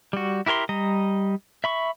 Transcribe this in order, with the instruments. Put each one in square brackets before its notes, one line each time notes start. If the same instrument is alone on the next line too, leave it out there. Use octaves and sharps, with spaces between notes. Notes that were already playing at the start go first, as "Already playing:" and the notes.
[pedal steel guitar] G3 F#4
E4 G4 A#4 C#5 C6
G3 D#5 A#5
E5 B5 C#6